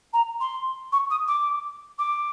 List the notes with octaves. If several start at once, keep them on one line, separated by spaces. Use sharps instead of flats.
A#5
C6
C#6
D#6
D6
D6